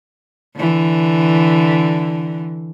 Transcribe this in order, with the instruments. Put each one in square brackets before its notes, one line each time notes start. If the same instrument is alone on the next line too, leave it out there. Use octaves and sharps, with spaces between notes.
[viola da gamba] D3 E3